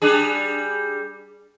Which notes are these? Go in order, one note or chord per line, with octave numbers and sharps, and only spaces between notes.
G3 D4 G#4